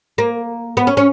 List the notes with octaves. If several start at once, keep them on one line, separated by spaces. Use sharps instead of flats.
A#3
B3
C#4
C#4